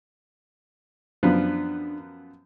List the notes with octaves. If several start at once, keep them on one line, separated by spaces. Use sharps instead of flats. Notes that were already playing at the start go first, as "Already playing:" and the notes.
F#2 F3 B3 D4